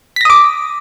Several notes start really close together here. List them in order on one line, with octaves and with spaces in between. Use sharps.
B6 A#6 D#6 D6